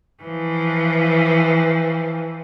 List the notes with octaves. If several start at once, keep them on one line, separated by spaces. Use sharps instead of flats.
E3 F3